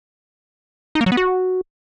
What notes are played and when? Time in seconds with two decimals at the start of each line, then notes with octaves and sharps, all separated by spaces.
0.95 D#4
1.01 A#3
1.06 F#3
1.12 B3
1.17 F#4